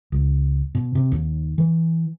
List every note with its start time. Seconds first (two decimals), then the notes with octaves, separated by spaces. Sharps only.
0.12 C#2
0.75 B2
0.95 C3
1.12 D#2
1.58 E3